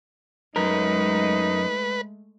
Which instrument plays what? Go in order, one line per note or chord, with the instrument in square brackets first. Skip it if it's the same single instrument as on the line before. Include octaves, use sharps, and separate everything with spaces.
[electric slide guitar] F#2 A#4 [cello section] G#3 A3 [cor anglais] D#4 [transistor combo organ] B4